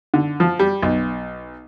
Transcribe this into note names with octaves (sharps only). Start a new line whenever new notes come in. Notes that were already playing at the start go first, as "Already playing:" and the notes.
D3
F3
G3
B1